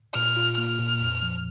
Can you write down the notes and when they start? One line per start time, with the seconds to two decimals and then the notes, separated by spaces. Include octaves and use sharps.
0.15 A#2 F6
0.36 F4
0.58 A#3 F6
0.79 A#2
1.01 F2
1.23 F3